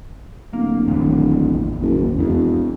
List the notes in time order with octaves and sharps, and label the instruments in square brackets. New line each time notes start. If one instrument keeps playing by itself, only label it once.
[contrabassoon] D1 [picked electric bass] A#3
[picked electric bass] G#1 E2 D#3
[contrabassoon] F#1
[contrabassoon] E1 [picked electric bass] F2